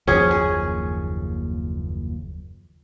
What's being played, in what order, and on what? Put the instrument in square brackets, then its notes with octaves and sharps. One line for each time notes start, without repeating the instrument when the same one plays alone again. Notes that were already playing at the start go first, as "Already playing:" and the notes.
[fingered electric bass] F#1 D#2 F3 [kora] C#4 G#4
[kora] G#4